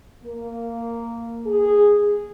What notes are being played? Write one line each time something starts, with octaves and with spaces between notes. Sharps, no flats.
A#3
G#4